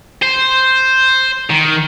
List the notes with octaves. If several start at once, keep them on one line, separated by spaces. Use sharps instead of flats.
C5
D#3